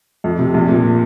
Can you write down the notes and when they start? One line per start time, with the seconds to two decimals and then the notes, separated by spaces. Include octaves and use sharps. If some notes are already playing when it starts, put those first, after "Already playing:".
0.24 F2
0.39 C3
0.54 A#1
0.69 A#2